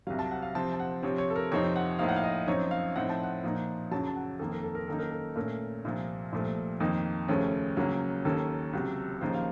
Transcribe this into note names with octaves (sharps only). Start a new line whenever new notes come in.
C2 C3 F#3 F5
A5
F#5
F5
C3 F3 C4 A5
A5
F#5
C3 F3 C4 C#5
C#5
A4
A#4
F2 C3 F3 C4 D#4 C#5
F#5
A2 F3 A#3 D#4 F5
F#5
F5
D#5
F#2 F3 C4 D#4 C#5
F5
A2 F3 C4 D#4 F#5
A5
F#5
A#2 F3 A#3 D#4
F#2 C#3 F#3 A5
A5
F#5
F2 D#3 A#3 A4
A#4
A4
A#4
F#2 D#3 A#3 D#4 A4
A#4
A4
A#2 A3 C#4 A#4
C2 A#2 F3 A#3
C2 A#2 F3 A3
F2 D#3 A#3 D#4
D#2 C#3 F3 A3 C#4
C#2 C#3 F#3 A#3 C#4
D#2 D#3 A#3 C#4 A4
C#2 C3 F#3
D#2 C#3 F3 A#3 D#4 C5
F5